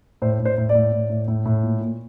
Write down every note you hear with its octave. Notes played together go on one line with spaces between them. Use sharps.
A2 C5
A2
C5
A2
D5
A2
A2
A2
A2
A2
A#2
A#2